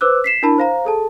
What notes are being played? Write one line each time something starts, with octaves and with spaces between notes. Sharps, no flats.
B4 C5 D6 E6 F#6
B6 C7 E7
D4 E4 A#4 A5 B5
C5 F5 A#5
G#4 A4 A5